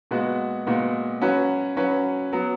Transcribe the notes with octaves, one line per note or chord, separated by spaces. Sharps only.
A#2 G#3 B3 F#4
A#2 G#3 B3 F#4
F#3 C#4 F#4 B4
F#3 C#4 F#4 B4
F#3 B3